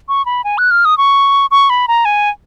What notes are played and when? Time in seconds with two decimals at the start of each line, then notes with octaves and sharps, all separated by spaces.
0.09 C#6
0.26 B5
0.44 G#5
0.58 F#6
0.71 F6
0.85 D#6
0.98 C#6
1.51 C#6
1.70 B5
1.88 A#5
2.05 G#5